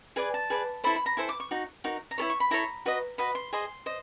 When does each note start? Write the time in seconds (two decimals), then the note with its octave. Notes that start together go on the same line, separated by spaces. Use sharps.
0.16 G#4 B4 D5 G#5
0.34 A5
0.50 G#4 B4 D5
0.84 E4 A4 C5 B5
0.95 B5
1.06 A#5
1.17 E4 A4 C5 G#5
1.29 D6
1.40 C#6
1.51 D#4 F#4
1.84 D#4 F#4 A#4
2.11 A#5
2.18 E4 A4 C#5 B5
2.30 C#6
2.40 B5
2.51 E4 A4 C#5 A#5
2.85 F#4 B4 D#5
3.18 F#4 B4 D#5 B5
3.35 C6
3.53 G#4 C5 D#5 C6
3.86 C5 D#5